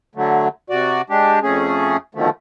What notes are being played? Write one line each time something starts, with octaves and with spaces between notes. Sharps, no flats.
D3 F#3 A3
C3 F#4 D5
G#3 D4 G4
F2 A3 C#4 G#4
F2 B2 D3 D#3 F3 A3